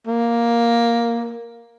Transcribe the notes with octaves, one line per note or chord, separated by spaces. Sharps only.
A#3